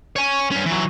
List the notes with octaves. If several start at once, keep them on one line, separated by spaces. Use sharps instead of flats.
C#5 G#5
G2 C#4
E3 F#3